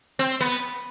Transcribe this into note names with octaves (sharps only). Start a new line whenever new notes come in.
C4
B3